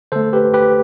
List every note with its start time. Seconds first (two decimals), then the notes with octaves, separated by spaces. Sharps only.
0.12 D3 A3 A4 C5
0.33 G4 B4
0.54 G4 B4